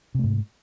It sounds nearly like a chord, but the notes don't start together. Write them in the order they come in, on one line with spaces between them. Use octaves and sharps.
C3 A3 G#2